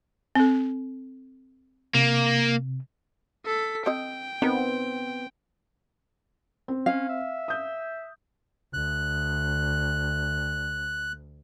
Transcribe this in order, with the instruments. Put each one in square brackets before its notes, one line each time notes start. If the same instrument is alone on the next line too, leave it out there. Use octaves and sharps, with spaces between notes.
[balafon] C4 A4
[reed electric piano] C3 [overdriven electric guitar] A#3
[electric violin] A4 B6
[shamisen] C4 D#5 [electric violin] G5
[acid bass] B3 [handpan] C4 [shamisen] D#4 A#4
[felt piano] C4
[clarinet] C#4 [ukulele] F5
[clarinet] E5
[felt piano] D#6 G6
[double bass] D2 [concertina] F#6